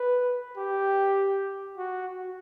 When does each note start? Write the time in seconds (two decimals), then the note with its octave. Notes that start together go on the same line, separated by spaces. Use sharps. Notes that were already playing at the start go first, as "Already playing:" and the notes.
Already playing: B4
0.57 G4
1.78 F#4